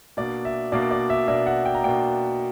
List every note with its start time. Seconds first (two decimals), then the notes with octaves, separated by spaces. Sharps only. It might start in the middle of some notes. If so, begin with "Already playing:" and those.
0.17 B2 A#3 D4 D5
0.45 E5
0.72 B2 A#3 D4 D5
0.91 D5
1.10 E5
1.28 B2 A#3 D4 E5
1.47 F#5
1.66 G5
1.74 A#5
1.83 B2 A#3 D4 G5